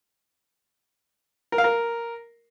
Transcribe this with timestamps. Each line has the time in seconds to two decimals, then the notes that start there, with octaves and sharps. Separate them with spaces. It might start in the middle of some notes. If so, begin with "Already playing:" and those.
1.52 A#4
1.58 F5
1.64 A#4